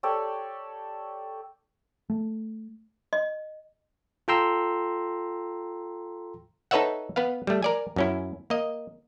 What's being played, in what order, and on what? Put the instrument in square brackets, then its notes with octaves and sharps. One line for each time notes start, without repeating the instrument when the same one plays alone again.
[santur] G4 A4 C#5 D5
[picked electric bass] A3
[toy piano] D#5
[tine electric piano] F4 A4 G5 A#5 C6 E6
[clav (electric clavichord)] D#4 A4 B4 C#5 E5 F#5
B3 B4 F5
G3 A3
A#4 D5 G#5
F#2 C#4 E4
A#3 D#5